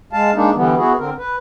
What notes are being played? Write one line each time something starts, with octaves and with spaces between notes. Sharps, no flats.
G#3 F5 A5
G#3 A#3 D4 D#4
D3 E3 G3 B3
B3 E4 F#4 G#4
D3 C4 A#4
B4